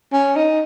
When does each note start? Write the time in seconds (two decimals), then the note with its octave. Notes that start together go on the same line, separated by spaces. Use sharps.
0.12 C#4
0.36 D#4